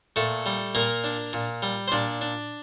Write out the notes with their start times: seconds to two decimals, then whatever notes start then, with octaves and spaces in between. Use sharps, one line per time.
0.16 A#2 A3 A4
0.46 G3
0.75 A#2 A#3 A#4
1.04 D4
1.33 A#2
1.62 G3
1.88 C5
1.92 A#2 D4 D5
2.21 D4